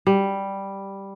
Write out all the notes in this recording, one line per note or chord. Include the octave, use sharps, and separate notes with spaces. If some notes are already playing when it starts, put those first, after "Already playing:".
G3